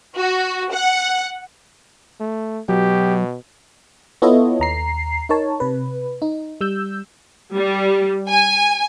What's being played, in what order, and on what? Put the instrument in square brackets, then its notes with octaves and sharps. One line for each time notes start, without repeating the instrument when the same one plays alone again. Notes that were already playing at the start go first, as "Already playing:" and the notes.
[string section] F#4
F#5
[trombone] A3
[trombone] B2 [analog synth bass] F#3 [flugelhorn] G4
[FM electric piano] B3 E4 F4 A4 C#5 D#5
D#2 A#5 C7
D#4 A#4 C#5 A5
C3 B4
D#4
G3 E6 G6
[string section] G3
G#5